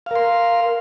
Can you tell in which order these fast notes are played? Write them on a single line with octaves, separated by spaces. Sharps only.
F5 A#4 C6